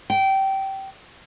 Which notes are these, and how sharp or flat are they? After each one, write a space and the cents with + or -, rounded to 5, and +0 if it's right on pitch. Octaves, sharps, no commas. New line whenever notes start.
G5 -20